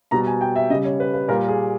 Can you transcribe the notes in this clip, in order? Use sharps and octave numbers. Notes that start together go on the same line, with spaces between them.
B2 G3 A#5
G#5
G5
E5
C#3 G3 D#5
C#5
B4
B4
A#2 G3 A#4
G#4